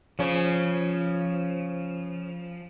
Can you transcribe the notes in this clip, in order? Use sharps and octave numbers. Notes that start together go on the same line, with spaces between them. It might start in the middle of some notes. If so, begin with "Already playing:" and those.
C#3 F3 C#4